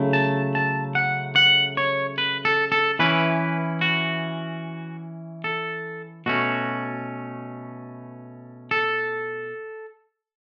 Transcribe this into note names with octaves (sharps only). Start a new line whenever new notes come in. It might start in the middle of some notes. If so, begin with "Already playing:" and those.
Already playing: C#3 F#3 A3 E4
A5
A5
F#5
F#5
C#5
B4
A4
A4
E3 C#4 E4 B4
F#4
A4
B2 A3 C#4 F#4
A4